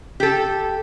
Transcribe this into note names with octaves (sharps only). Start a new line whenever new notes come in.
G4 A4